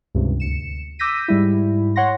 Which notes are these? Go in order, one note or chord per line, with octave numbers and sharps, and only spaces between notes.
C#2 G2 C3
D2 C#7 E7
D6 E6 G6 A#6 B6 D#7
G#2 G3 E4
C#5 F#5 C6 A#6